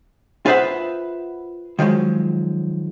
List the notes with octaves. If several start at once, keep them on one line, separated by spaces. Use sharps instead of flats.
F4 G#4 B4 C5 E5 F#5
D#3 F3 F#3 G#3